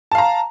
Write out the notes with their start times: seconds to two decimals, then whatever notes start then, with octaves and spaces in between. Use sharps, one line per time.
0.11 A5
0.15 F5
0.18 A#5